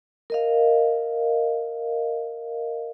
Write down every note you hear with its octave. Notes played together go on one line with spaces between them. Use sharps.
A#4 D#5 F5